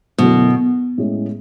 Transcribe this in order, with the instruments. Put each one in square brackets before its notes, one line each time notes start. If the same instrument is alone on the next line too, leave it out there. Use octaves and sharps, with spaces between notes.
[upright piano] F#2 D3 F#3 A3 E4 [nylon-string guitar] B2
[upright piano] A2 G#3 C#4